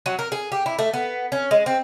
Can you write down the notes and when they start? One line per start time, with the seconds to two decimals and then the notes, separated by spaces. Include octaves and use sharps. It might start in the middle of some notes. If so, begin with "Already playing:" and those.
0.06 F#3
0.19 A#4
0.32 G#4
0.52 G4
0.66 E4
0.79 A3
0.93 B3
1.32 C#4
1.51 G#3
1.66 C4